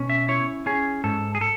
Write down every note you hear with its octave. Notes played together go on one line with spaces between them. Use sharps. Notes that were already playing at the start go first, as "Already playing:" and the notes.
Already playing: B2 C#4
E5
E4 C#5
C#4 G#4
G#2 A4
G#4
A4